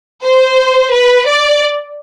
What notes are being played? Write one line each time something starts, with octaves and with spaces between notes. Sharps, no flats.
C5
B4
D5